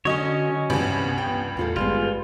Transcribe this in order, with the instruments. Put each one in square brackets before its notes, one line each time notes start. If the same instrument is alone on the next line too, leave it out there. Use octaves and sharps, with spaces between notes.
[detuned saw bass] D3 [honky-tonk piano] F#3 D#5 [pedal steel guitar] C#4 C#5 [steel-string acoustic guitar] F#4
[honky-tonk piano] C#2 G2 [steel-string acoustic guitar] C3 E3 G4 [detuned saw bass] B3
[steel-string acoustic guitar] G5
[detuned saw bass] E2 [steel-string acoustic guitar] A2 F4 A4
[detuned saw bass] G#1 [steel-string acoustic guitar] G3 G#3 B3 [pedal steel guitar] F4